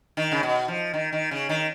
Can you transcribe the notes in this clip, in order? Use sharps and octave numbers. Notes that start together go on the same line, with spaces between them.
D#3
C#3
B2
F3
D#3
D#3
C#3
D#3